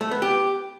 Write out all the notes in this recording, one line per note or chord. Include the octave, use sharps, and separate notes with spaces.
A3
B3
G4